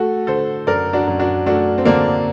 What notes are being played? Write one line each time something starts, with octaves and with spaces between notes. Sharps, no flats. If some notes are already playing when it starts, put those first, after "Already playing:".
Already playing: A3 F#4 A4
D3 A4 C5
F#2 A#4 D5
D4 F#4
F#2
D4 F#4
A3 D4 F#4
C4
D3 A#3 D4